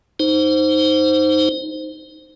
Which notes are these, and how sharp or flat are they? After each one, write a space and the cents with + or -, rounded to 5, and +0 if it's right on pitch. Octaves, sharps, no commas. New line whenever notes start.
D#4 +0 C5 +0